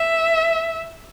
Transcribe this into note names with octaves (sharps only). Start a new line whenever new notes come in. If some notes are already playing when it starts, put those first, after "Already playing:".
Already playing: E5